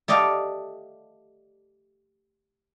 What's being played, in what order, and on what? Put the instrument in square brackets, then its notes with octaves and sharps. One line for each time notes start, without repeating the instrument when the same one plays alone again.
[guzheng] A3 G4 D5 D#5 F5